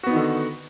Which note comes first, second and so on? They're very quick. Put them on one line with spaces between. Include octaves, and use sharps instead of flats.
F#4 B3 D#4 D#3 D3